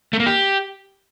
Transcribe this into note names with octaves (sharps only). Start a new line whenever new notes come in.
A3
A#3
G4